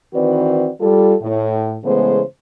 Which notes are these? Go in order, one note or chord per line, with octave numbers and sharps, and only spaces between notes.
D#3 E3 C4 F#4 B4 D5
G3 F4 A4
A2
C#3 E3 G#3 A3 B3 C5